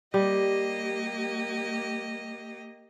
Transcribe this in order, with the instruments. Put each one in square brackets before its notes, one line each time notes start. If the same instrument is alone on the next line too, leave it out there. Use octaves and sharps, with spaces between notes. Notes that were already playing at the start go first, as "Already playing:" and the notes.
[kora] G3 [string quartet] A#3 G4 D#5